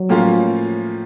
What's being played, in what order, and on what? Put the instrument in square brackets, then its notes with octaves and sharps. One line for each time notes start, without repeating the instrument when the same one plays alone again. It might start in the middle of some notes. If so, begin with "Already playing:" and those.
Already playing: [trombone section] F#3
[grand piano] A2 F3 A#3 C#4 F4